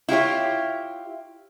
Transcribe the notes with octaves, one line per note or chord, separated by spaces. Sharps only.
E4 F4 G4 C#5